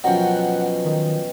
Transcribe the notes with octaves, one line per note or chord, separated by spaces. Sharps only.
B2 F3 F#3 C#4 F#5 G5
D#3